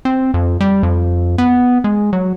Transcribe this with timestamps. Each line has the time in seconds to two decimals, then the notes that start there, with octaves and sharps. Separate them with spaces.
0.05 C4
0.34 F2
0.60 G3
0.83 F2
1.38 B3
1.84 G#3
2.13 F#3